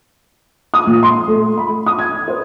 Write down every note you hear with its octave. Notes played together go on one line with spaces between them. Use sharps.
D#6
A#1
C6
A3
B5
D#6
G#6
C5